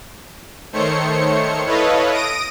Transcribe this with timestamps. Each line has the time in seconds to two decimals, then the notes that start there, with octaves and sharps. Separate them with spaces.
0.73 D#3 A3 C5 C#5 C#7
1.66 E4 A4 B4 C#5 D#5 F5
2.11 D#6 A#6 D7 D#7